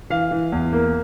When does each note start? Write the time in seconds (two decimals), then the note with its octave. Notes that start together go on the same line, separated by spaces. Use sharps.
0.10 E3 F5
0.31 E3
0.52 E2
0.73 A#3